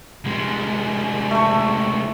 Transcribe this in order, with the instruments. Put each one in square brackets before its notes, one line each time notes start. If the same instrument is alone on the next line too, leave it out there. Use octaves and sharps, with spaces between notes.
[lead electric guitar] C2 G#3
[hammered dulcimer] A3 C#6